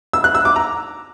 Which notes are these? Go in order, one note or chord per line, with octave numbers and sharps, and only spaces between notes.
E6
F#6
E6
D6
A#5